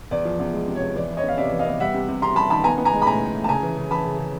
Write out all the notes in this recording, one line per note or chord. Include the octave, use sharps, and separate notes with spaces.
E2 D5
F3
E2
G#3
C3
C#5
E2
E3 D5
E3
C#5 D#5
B3 F5
C3 D5 E5
E3
D#5 F5
B3
G3 E5 F#5
C3
C3
C3 A#5 C6
G3 A5 B5
D#3 A5 B5
B3 G#5 A#5
B3
G#5 A#5
G#3
B5
A2 G#5 A#5
A2
A2
A5
C#3 G#5 A#5
E3
C#3
E3 A5 B5
C#3
C#3